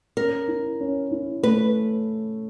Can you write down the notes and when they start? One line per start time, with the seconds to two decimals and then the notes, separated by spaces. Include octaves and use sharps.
0.17 C#4 A#4
0.48 E4
0.80 C#4
1.11 E4
1.43 A3 B4